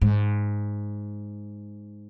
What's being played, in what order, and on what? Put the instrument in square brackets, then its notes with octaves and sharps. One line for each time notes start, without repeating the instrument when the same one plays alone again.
[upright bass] G#2